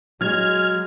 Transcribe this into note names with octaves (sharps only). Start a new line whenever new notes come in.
F#3 G#3 F6 G#6